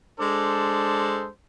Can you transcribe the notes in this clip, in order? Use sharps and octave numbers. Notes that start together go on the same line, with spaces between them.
G#3 D4 A4 C5